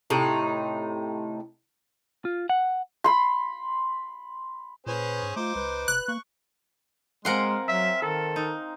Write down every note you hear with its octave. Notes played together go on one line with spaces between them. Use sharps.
A2 C3 D#4
F4
F#5
B5 C6
A#2 C#4 G#4 B4 C5
G#2
A3 D#4 F4 C5 D6
C#2 B4
F1 F#6
A#3 C#6
G#3 C4 A#4 F5 F#5 G#5 C6
F#3 E5
D#3 A4 A#4
D#4